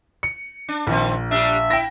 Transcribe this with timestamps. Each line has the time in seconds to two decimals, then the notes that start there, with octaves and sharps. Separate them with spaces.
0.23 C#7
0.68 D4
0.87 A#1 D#3 C4
1.31 G3 D4 E5
1.70 E4 G5 A#6